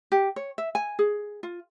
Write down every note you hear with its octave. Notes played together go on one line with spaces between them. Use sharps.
G4
C#5
E5
G#5
G#4
F4